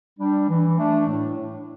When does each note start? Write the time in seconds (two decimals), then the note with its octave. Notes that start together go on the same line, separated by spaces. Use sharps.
0.19 G3 D4
0.49 E3
0.78 A3 D4
1.06 A2